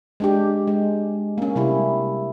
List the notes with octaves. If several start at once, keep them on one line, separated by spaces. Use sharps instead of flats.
G#3 D4 G4
G#3
A#3 C#4
C3 G3 E4